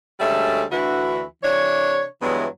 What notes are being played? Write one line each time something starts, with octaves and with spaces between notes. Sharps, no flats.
D2 G3 G#3 C#4 A4 E5
D2 D3 E3 E4 F#4
C3 E3 D4 C#5
G2 E3 F#3 G#3 B3 E4